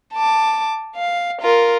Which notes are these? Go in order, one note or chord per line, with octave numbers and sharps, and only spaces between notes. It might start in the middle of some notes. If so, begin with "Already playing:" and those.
A5 D6
F5
F4 A#4